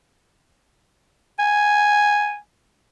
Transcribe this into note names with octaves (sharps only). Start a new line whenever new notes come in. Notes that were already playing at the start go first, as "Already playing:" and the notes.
G#5